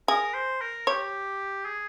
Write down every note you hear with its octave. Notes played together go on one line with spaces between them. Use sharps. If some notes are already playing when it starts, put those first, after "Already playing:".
G#4 A#4
C5
A#4
G4 C#5
G#4